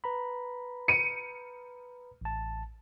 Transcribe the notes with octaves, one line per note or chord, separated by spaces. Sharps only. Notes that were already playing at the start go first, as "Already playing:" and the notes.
B4 A#5 B5
C#7 D#7
A1 A5